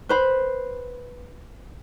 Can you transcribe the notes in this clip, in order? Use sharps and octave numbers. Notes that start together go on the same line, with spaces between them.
B4 C5 B5